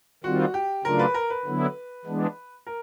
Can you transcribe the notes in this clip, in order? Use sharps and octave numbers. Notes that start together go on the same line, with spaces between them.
D#3 G3 C4 F4 F#4
G4
C#3 F#3 A3 D4 F4 A#4
B4
A#4
B4
D3 F#3 B3 E4
E3 G#3 B3 D4
A#4